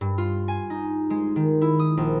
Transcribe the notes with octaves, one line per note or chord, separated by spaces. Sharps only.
G2
F4
G#5
D#4
G#3
D#3
E4
D#6
A#1